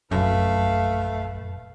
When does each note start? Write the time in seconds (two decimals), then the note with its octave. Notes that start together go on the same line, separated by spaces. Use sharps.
0.11 F1 A#1 F#2 A3 B4 F5